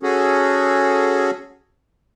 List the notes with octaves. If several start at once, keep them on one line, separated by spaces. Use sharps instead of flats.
C#4 F#4 G#4 A4